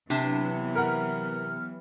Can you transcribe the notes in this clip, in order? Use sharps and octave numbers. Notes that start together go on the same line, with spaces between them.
C3 E3 F#3 B3 D4
A#4 F#5 F6